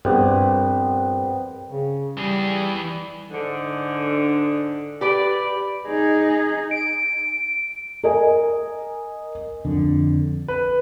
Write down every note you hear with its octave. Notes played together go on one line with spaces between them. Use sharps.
A#1 G2 B3 C4
C#3
E3 G3 G#4
G#2 D3
G4 B4 D5
D#4 G#4
D7
A#4 D#5 G#5
F2 D3
B4